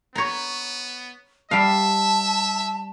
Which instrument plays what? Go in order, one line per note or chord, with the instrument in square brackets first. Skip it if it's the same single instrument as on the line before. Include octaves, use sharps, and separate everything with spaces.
[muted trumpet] B3 [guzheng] C#5 A#5
[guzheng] G3 F5 [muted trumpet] E5 [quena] A5